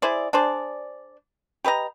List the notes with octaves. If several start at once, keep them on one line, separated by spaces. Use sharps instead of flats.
E4 G#4 C5 D5
D4 G#4 C5 D5
G4 B4 D#5 A#5